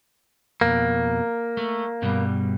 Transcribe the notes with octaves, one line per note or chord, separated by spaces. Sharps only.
F2 B2 A#3
A3
G2 B2 G3